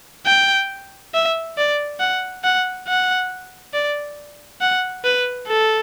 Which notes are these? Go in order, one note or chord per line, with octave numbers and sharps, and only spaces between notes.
G5
E5
D5
F#5
F#5
F#5
D5
F#5
B4
A4